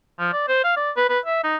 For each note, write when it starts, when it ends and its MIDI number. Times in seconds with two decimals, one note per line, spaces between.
0.20 0.30 53
0.33 0.48 74
0.49 0.60 72
0.64 0.73 77
0.77 0.91 74
0.97 1.08 71
1.10 1.19 71
1.26 1.43 76
1.44 1.57 63